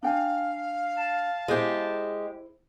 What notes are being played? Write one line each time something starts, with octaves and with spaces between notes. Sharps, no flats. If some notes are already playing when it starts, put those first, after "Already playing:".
D4 F5 G5 G#5
A5
G#3 E4 G4 G#4 C5